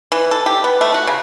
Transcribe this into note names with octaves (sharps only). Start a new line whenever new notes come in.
E3
A4
G4
B3
A3
F#4
C#3